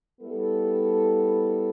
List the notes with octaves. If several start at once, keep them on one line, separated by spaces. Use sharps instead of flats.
G3 B3 E4 A4